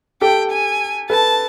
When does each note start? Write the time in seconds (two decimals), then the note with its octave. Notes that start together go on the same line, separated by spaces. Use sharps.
0.21 G4 A4 G5
0.51 G#5
1.10 A4 B4 A5